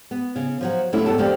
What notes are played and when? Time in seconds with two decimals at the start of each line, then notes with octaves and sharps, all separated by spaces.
0.11 B3
0.36 C#3
0.61 F3 F#3 F#4
0.93 F#3 A3 C#4 D4 E4 F4
1.06 G2 B3 A4 F#5 A5
1.18 F2 D3 A#3 G4 D5